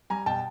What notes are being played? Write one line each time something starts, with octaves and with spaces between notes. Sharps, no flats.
G3 G#5 A#5
B2 G5 A5